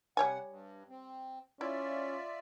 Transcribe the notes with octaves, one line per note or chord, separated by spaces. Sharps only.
C3 G3 C#5 F#5 G#5
G2
C4
C#4 E4 F4 D5 E5